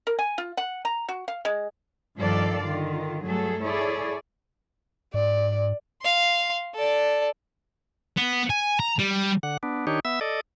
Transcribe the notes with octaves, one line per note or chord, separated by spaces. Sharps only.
A#4
G#5
F4
F#5
A#5
F#4
F5
G#3
G2 D#3 F3 A4 D5 F5
D3 D#3 F4
G2 F#3 A3 G#4 A4
E4 G#4 A4 C#5 D5
G#2 D5
F5 C6
A4 D5
B3
G#5
A#5
G3
D3 F#5
B3 D4
D#3 D4 D#4 G4 C#5
B3 E5 E6
A4 D5 D#5